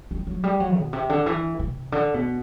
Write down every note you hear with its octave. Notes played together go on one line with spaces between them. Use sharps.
G3
F#3
G3
F#3
B2
C3
D3
E3
C3
D3
B2